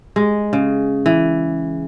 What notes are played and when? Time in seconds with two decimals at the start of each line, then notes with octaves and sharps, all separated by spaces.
0.16 G#3
0.53 C#3
1.06 E3